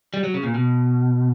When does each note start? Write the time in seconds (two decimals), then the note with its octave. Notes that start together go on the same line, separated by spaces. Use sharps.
0.14 G3
0.24 F#3
0.34 C#3
0.43 A#2
0.55 B2